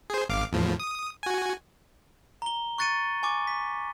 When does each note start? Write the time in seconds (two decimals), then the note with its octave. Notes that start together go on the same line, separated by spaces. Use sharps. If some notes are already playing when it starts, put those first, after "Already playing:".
0.10 G#4 C5
0.29 G#1 F5 D6
0.52 E2 A2 F3
0.80 D#6
1.23 F#4 G#5
2.42 A#5 G7
2.78 C#6 F#6 A6 C#7 D#7
3.23 G#5 C#6 D6
3.47 B6